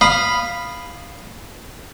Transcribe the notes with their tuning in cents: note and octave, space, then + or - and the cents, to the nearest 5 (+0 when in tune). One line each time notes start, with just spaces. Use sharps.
F5 -5 B5 +0 D#6 -15